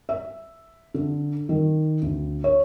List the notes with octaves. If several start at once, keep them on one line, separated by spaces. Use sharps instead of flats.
E5
D3
D#3
D2
C#5